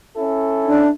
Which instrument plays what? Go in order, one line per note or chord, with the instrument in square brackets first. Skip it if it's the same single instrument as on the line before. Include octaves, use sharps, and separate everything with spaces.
[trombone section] C#4 E4 A4
[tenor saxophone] D4